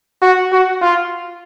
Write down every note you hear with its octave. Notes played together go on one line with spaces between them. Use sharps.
F#4
F#4
F4